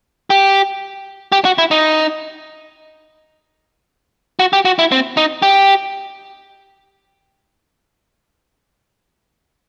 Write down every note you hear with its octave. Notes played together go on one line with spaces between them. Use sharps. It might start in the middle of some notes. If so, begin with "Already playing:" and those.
G4
G4
F#4
E4
D#4
F#4
G4
F#4
E4
C4
D#4
G4